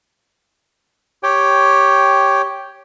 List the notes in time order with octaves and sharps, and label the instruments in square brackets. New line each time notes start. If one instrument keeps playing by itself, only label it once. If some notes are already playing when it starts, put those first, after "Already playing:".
[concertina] G4 C#5 G5